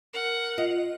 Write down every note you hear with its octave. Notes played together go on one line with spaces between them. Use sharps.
A#4 F#5
F4 D#5